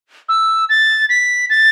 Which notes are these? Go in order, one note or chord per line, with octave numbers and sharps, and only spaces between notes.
E6
A6
B6
A6